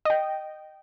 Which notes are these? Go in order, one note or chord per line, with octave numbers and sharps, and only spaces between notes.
D#5 G5